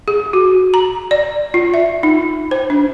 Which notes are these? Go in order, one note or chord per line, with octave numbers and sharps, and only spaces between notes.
G#4
F#4
A#5
D5
F4
E5
D#4
C5
D4